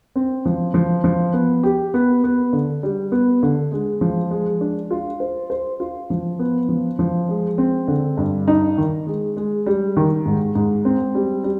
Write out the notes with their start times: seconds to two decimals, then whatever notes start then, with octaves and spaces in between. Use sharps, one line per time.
0.16 C4
0.45 F3
0.74 F3
1.04 F3
1.33 B3
1.63 G4
1.94 B3
2.24 B3
2.53 D3
2.83 G3
3.12 B3
3.43 D3
3.72 G#3
4.01 F3
4.31 G#3
4.61 D4
4.91 F4
5.20 C5
5.50 C5
5.80 F4
6.10 F3
6.39 B3
6.69 F3
6.99 F3
7.28 G#3
7.58 C4
7.88 D3
8.17 G2
8.48 D#4
8.78 D#3
9.07 G#3
9.37 G#3
9.66 G3
9.97 D#3
10.26 G#2
10.55 G#2
10.85 C4
11.15 G3
11.44 G3